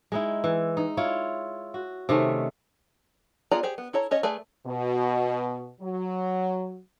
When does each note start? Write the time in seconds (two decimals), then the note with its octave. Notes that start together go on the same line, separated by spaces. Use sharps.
0.12 G#3 D#4 E4
0.44 E3
0.77 D#4
0.97 E4 F4 C#5
1.74 F#4
2.09 C3 D#3 A3 C#4
3.51 B3 F4 G#4 D5 A#5
3.63 G4 G#4 C5
3.78 B3
3.93 E4 A4 C#5 A#5
4.11 C#4 C#5 D#5
4.23 A3 G#4 B4 D5 G#5
4.66 B2
5.81 F#3